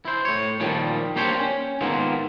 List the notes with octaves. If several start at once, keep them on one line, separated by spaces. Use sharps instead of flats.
E4 C5
A2 C#5
A#2 D#3 F3 G3
A#3 D4 G4 C5 C#5
C#4
G#2 D#3 A#3 B3 E4 F4